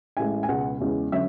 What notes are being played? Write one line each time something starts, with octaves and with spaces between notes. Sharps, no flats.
A1 A2 G#3 G#5
G#5
C#2 B2 G#3 F#5
E2 C#3 G#3 C#4
D3 F#3 C#4 E5